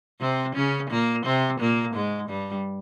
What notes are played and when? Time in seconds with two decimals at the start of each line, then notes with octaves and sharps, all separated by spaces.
0.21 C3 C4
0.55 C#3 C#4
0.90 A#2 A#3
1.25 C3 C4
1.60 A#2 A#3
1.94 G#2 G#3
2.29 G2 G3